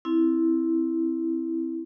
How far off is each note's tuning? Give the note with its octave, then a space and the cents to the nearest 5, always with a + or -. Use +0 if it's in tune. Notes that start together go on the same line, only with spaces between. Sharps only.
C4 +0 E4 -5